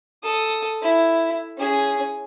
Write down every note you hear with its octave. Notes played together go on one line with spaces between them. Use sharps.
A4 D#6
E4
C#4 G#4